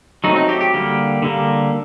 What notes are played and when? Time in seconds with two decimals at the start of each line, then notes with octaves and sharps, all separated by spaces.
0.24 F#3 A3 C4 D#4
0.36 D#4
0.49 G4
0.61 G4
0.74 D3 G3 A#3
1.22 D3 G3 A#3